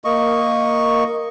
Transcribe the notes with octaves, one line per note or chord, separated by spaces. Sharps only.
A#3 D#5 C#6